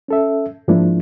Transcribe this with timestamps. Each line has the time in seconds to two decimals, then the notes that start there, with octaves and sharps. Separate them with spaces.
0.08 C#4 A4 E5
0.68 G#2 F3 G#3 A#3 D4 E4